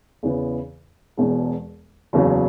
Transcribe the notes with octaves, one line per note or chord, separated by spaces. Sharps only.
E2 C#3 E3 B3
E1 E2 B2 G#3
F#1 E2 C#3 F#3